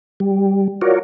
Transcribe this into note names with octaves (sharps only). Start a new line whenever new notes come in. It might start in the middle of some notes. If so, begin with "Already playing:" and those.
G3
F4 F#4 A#4 C#5 D5